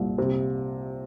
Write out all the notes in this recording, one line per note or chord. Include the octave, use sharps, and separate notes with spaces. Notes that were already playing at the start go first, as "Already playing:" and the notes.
Already playing: C2 A#2
C3